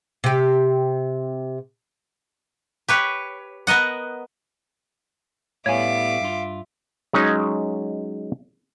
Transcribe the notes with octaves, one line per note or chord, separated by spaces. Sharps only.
C3 G4
G4 B4 C#5
B3 A#4 D#5 F#5
A2 G3 B3 C#5 E5 F5 G#5 D6
G2 F4
F#3 G#3 C#4 D#4